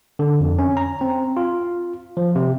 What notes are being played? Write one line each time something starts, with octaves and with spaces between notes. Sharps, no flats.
D3
F2
C#4
A#5
C4
F4
F3
C3